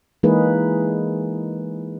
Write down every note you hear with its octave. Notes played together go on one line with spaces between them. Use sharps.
E3 G#3 A#3 D#4 G#4 B4